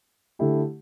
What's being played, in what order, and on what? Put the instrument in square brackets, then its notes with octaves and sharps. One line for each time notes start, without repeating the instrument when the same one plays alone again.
[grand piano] D3 A3 E4 G4